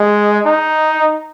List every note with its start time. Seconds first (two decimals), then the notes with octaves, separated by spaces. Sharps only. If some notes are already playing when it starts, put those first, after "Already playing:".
Already playing: G#3
0.46 D#4